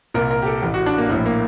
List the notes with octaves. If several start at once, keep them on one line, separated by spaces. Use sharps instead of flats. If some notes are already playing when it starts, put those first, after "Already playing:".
C2 A#2 A#4
A#4
G4
A4
A1 A2 G4
F#4
D4
A#3
A#1 A2 A#3
A#3